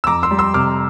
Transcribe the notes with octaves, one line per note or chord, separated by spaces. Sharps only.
E6
F2 A#5 D6
C6 E6
G3
C6 E6
C3 D6 F6